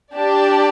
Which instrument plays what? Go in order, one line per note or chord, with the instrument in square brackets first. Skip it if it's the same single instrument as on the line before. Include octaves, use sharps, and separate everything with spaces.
[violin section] D4 G4 D5 A5